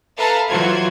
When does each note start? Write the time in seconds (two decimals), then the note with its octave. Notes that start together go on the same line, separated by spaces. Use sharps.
0.17 A4 B4 E5 F5 A5 A#5
0.49 E3 F#3 F4 F#4 C5 G#6